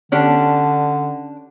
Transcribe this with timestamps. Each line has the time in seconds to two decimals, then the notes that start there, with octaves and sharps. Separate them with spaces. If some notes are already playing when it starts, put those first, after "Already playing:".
0.12 D3 C#4 D4 G4